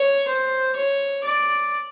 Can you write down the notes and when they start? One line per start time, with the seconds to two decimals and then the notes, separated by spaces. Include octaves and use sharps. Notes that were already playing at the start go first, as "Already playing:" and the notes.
Already playing: C#5
0.27 C5
0.76 C#5
1.23 D5